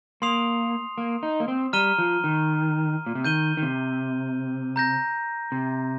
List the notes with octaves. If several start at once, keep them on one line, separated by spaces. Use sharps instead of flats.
A#3 C6 D#6 C7 F7
A#3
D#4
A#3
C4
G3 A#5 F6 D#7 G7
F3
D#3
A#2
C3
D#3 G6 D#7 G7
D#3
C3
A#5 G6 A#6
C3